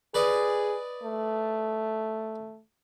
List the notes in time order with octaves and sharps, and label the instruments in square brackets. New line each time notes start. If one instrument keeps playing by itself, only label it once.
[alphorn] G#4 [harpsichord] B4 D5 D#5
[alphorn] A3